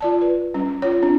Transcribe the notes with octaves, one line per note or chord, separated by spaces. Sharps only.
F4 D5 A5
B4
G3 C#4
F4 C#5
C4 D4